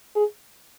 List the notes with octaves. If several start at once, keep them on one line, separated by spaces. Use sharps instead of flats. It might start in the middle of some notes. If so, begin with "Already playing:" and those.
G#4